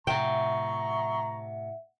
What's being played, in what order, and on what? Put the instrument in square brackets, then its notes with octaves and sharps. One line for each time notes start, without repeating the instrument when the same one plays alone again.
[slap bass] A2 C3 [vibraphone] E5 F#5 [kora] G5 [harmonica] A#5 C#6